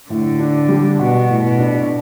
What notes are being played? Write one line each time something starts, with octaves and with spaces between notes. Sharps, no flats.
A2 D3
D4
G3
B2 F#4
A2
B2
D4